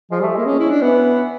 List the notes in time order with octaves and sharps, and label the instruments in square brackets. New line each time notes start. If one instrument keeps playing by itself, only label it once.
[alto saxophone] F3 [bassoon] G#3
[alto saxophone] G3 [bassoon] A3
[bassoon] G#3 [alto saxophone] A#3
[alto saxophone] C#4
E4
D4
[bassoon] E3 [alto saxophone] B3